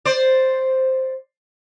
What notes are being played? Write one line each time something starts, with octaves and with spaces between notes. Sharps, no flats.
C5 D5